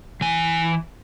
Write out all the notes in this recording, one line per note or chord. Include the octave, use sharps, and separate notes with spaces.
E3 G#5